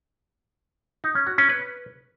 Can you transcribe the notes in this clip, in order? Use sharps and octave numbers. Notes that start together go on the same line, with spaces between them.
D#4
C#4
F#4
C#4
B4